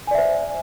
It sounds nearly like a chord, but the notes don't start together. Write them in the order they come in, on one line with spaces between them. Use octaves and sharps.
G#5 D5 E5 C5